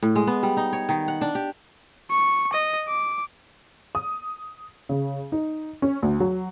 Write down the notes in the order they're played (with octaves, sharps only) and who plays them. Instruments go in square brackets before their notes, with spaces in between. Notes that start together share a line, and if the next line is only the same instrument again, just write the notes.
[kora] A2
G#3
B3
G3
D#4
C#5
D#3
F#5
D4
G4
[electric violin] C#6
D#5
D6
[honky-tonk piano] D#6
C#3
D#4
C#4
D2
F#3